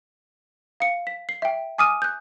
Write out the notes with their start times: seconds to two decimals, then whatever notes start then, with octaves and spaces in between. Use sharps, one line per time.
0.80 F5 C#7
1.07 B6
1.29 C7
1.42 E5 G5
1.78 G#5 D6 D#6 F6 D#7
2.02 F#6 G6